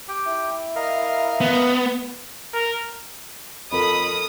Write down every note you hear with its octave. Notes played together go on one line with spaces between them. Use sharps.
G4 G5
E4
A#4 D#5 F5
B3
A#4
F2 A4 A#4 D#5 B5 D#6